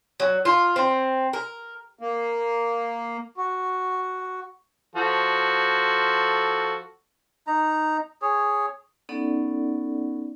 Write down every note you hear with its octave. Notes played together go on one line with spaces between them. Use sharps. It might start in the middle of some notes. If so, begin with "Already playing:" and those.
F#3
F4
C4
A#4
A#3
F#4
F3 F#4 A4
D#4 A#5
G#4 C#5
B3 C#4 D#4 A4 D5 F#5